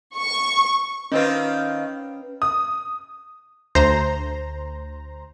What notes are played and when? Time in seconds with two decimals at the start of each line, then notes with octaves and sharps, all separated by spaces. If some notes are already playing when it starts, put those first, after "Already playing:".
0.16 C#6
1.12 D#3 C4 C#4 F4 B4
2.42 D#6
3.75 D2 C5 A#5